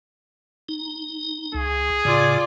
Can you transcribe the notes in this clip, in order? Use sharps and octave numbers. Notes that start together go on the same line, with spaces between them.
D#4
C#2 G#4
A2 C#3 F4 D5